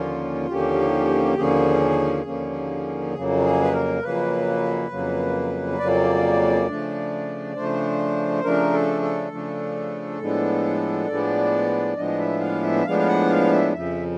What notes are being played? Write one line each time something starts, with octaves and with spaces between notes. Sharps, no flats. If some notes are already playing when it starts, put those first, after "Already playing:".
Already playing: D#2 D3 F3 A#3 C#4 F4
D#2 D3 F3 A#3 C#4 G4
D#2 D3 F3 A#3 C#4 G#4
D#2 D3 F3 A#3 C#4
F2 C#3 F#3 A#3
G#4
B4
A#4
F2 C#3 F#3 A#3 B4
F2 C#3 F#3 A#3
F2 C#3 F#3 A#3 D5
C#3 F3 A3 D4
C#3 F3 A3 D4 C5
C#3 F3 A3 D4 A#4
A4
A4
C#3 F3 A3 D4
A2 F3 G#3 B3 D4
A2 F3 G#3 B3 D4 D5
A2 F3 G#3 B3 D4 D#5
E5
F5
E5
A2 F3 G#3 B3 D4 F5
F5
F#5
F5
E5
F2 C#3 F3 E5